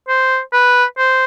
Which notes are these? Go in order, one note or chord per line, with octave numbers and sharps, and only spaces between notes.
C5
B4
C5